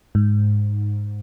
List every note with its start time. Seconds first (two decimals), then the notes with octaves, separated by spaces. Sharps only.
0.15 G#2